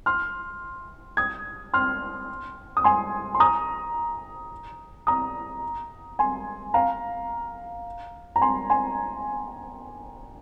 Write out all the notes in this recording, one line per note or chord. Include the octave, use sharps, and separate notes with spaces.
C6 F6
D#6 G#6
C6 F6
D#6
G#5 C6
C6
A#5 D#6
A#5 D#6
G#5 C6
F5 A#5
A#5
G#5 C6
G#5 C6